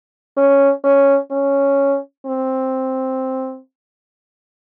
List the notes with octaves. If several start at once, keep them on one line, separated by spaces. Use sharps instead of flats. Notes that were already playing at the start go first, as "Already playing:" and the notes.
C#4
C#4
C#4
C4